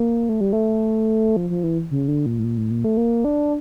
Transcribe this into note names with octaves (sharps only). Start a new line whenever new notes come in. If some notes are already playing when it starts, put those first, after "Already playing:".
Already playing: A#3
A3
G3
A3
F3
F3
E3
C#3
D3
A#2
A2
A#2
A2
A#2
A3
A#3
D4